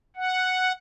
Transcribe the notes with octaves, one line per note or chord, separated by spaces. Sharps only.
F#5